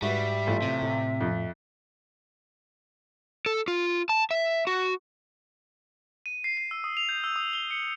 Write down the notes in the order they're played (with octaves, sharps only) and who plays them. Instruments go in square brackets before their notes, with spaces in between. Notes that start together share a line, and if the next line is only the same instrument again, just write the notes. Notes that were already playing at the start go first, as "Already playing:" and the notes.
[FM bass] G#2 [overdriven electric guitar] G3 [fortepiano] F#4 B4 [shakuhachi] E5
[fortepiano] A1 F4 A4
[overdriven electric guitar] C3
[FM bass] A2
[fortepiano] F2
[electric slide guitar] A4
F4
A5
E5
F#4
[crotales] D#7
C7
C7
E6
D#6
F7
G6
E6
D#6
G7
C#7